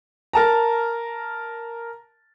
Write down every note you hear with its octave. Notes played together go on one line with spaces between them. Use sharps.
A#4 A5 A#5